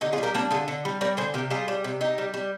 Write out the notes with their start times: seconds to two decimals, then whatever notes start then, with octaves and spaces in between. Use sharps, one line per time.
0.01 D3 D#4 G4
0.13 F4 G#4
0.18 G3
0.23 G4 A#4
0.34 G3 A#3 D4
0.51 D3 F4 G#4
0.68 D3
0.85 G3
1.01 G3 A#4 D5
1.17 D3 G#4 C5
1.34 C3 G4 A#4
1.50 G3 F4 G#4
1.68 G3
1.84 C3
2.01 C3 D#4 G4
2.18 G3
2.34 G3